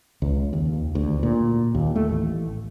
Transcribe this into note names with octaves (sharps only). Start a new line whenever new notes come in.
C#2
D#2
D2
A#2
D#2
A3
A1